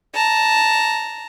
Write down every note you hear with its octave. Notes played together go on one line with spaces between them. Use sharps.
A5 A#5